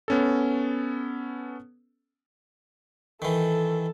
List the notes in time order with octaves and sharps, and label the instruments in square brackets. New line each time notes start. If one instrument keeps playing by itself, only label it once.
[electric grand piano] B3 C#4 A4
[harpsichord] D#3 E3 [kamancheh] A4